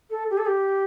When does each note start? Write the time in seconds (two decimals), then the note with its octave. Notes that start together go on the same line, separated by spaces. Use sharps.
0.10 A4
0.30 G4
0.38 A4
0.46 G4